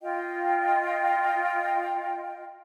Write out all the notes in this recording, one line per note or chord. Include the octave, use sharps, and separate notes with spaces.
F4 D#5 G5